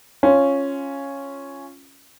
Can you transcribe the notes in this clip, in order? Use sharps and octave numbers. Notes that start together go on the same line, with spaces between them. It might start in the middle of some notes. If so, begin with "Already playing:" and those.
C#4 F4